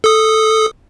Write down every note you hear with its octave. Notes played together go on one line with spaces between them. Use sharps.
A4 D#6